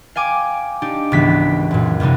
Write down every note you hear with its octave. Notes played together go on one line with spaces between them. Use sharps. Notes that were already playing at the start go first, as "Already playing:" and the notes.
F5 G5 G#5 D6
D4 D#4 G4
G#1 C#2 E3 G3 B3 B6
F#2 A#2
E2 C3 G3 B3 D#4